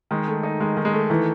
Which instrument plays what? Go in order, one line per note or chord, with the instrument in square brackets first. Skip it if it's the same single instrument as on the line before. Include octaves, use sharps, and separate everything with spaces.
[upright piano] D#3 [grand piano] G#3
[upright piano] A3
D#4
[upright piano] D#3 [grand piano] G#3
[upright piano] D#3
[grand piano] G#3
[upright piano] A3
[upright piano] D#3 [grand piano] E3